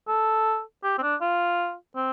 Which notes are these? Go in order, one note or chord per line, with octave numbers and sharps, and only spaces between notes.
A4
G4
C4
D4
F4
C4